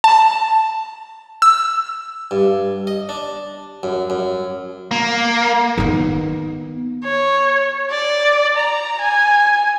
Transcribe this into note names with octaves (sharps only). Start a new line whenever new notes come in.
A5
E6
G2
D#5
D4
F#2
F#2
A#3
D#3 B3
C#5
D5
A#5
G#5